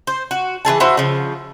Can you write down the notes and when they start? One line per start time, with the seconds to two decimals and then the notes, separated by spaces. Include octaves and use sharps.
0.07 C5
0.31 F#4
0.65 E3 F4 G#4 A5
0.80 D4 E4 F#4 C5
0.97 C#3 F3